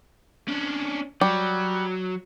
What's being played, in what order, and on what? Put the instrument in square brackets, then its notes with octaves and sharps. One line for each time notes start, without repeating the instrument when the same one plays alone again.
[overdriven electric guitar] C#4 D4
[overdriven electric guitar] F#3 [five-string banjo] G3